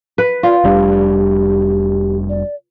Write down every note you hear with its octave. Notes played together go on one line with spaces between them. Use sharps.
B4
F4 D5
F1 G3 D4 G4
D5